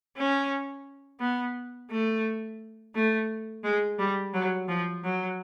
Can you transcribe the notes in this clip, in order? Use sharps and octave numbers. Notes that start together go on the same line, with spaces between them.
C#4
B3
A3
A3
G#3
G3
F#3
F3
F#3